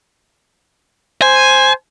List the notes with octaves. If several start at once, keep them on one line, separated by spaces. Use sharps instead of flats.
C5 G#5